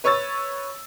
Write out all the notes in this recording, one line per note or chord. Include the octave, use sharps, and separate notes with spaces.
B4 C#5 C#6 E6 A6